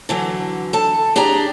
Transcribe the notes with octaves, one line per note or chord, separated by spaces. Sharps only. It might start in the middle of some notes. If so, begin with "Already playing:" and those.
D3 E3 F#3
A4 A5
D4 G4 G#4 D5 A#5